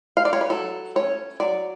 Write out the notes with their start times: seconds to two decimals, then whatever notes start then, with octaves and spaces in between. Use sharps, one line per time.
0.17 F5
0.25 D5
0.33 C#5
0.41 B4
0.50 F#3 A4
0.96 A3 C#4 C#5
1.40 F#3 D5